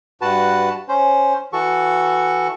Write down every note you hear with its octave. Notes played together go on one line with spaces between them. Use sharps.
G2 F#4 B4 A5
C#4 C5
E3 F#4 A4 C#6